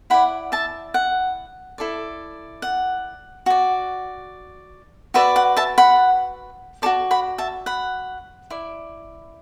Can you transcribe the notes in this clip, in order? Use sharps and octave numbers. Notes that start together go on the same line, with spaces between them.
E4 D5 F#5 B5
E5 A5
F#5
E4 A4 D5
F#5
F#4 D5
F#4 B4 D5 E5
F#5
E5 A5
F#5 B5
F#4 A4 D5 A5 D6
F#5 B5
E5 A5
F#5 B5
E4 D5